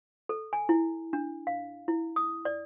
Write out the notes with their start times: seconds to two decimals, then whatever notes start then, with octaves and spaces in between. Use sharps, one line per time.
0.29 A4
0.53 G#5
0.69 E4
1.13 D4
1.47 F5
1.88 E4
2.16 D#6
2.45 D5